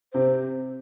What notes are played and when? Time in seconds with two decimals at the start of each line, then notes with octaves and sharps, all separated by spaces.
0.14 C3 C5